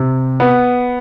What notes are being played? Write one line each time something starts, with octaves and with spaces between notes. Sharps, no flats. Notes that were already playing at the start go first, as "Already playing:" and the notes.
Already playing: C3
B3